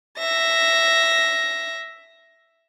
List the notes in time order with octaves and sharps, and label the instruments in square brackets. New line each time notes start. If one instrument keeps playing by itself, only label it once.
[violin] E5 A#6